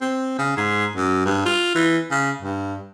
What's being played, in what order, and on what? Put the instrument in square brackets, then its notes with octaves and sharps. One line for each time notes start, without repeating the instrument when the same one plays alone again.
[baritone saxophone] C4
C#3
G#2
F#2
G2
F4
E3
C#3
G2